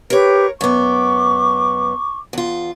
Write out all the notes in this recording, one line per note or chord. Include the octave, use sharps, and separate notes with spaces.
G4 A#4 B4 C#5
F#2 B3 C#6 D6
E2 F4